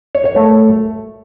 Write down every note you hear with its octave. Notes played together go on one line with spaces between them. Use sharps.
C#5
C#5
A3